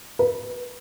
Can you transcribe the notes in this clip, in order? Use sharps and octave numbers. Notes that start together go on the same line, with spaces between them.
B4